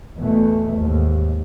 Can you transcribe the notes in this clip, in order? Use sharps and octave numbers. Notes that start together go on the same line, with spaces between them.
E2 B2 E3 A3
D#2 G#2